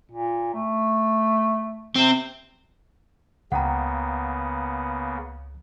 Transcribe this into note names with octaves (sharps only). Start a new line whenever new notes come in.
A#2
A3
C3 C4
C#2 C#3 A#3 B3 F#5 G5 A#5